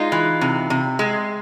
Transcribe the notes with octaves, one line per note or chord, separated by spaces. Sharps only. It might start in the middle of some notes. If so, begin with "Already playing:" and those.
Already playing: G#3 D#4 F4
E3
C3
C3
G#3